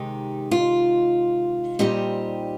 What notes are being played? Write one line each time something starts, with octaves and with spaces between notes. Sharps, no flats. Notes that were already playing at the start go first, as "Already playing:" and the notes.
Already playing: C3 D#3 G#3 D#4 G4
F4
A#2 G3 C4 D#4 G4